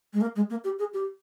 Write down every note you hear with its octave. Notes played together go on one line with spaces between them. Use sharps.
G#3
A#3
G#3
A#3
G4
G#4
G4